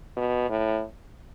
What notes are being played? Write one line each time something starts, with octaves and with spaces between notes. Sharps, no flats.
B2
A2